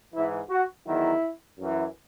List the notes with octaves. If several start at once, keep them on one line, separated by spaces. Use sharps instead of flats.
G#2 E3 E4
F#4
E2 D#3 F#3 E4
F#2 E3